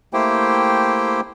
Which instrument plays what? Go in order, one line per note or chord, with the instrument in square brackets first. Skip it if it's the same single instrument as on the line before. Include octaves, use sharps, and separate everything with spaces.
[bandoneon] A3 A#3 E4 G4 C5 G5